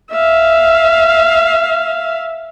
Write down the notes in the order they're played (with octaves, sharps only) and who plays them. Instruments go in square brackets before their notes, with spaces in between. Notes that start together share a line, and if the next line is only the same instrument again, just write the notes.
[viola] E5 F5